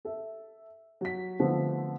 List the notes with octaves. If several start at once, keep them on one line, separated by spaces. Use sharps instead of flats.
A4 E5
F#3 B6
D3 F3 A3 B3 C4